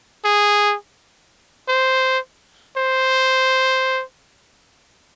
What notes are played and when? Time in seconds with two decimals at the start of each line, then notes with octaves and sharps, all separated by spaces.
0.25 G#4
1.69 C5
2.77 C5